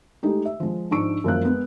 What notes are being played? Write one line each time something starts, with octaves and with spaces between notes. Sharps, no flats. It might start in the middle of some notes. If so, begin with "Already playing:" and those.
G#3 A3 D#4 E4 G4
E5
F3 G#3
G#2 F3 D4 C#6 E6 D7
F#2 F3 G#3 A#3 F5 F#6
G#3 B3